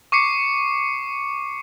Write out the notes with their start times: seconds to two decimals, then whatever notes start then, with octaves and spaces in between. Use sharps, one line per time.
0.12 C#6 D6 C7 C#7